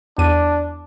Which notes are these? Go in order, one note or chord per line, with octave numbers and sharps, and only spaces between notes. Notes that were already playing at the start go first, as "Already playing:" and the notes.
E2 D4 D#7